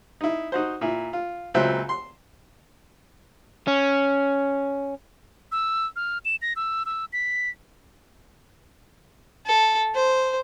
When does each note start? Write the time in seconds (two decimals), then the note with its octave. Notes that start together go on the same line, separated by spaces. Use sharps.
0.21 D#4 E4
0.52 D#4 F#4 C5
0.81 A#2 E4
1.13 F4
1.54 C#2 A#2 F#3 C4 E5
1.89 C6
3.68 C#4
5.52 E6
5.96 F6
6.25 E7
6.42 A#6
6.56 E6
6.86 E6
7.13 B6
9.46 A4
9.95 C5